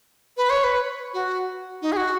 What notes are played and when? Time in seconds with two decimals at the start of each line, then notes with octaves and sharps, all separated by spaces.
0.37 B4
0.50 C#5
0.64 B4
1.14 F#4
1.82 D#4
1.92 G#4
1.96 F#4